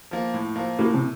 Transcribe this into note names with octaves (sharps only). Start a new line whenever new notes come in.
F3 A#3
A2
F3 A#3
A2 A#3
C3